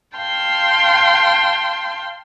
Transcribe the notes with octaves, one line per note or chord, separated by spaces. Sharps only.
F5 G5 A5 C6